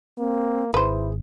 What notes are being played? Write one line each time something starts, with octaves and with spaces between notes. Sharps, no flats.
A#3 C4
G#1 E4 G#4 B4 C5